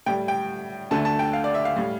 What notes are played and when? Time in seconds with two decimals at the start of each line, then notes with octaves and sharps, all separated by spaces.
0.06 A2 G3 G5
0.28 G5
0.91 D2 D3 A3 A5
1.05 A5
1.19 G5
1.33 F5
1.44 D5
1.54 E5
1.65 F5
1.76 A2 G3